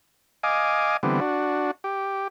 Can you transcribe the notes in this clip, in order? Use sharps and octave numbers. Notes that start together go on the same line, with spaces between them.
D#5 F5 G#5 D6
D3 E3 G3 B3 C4
D4 F#4
G4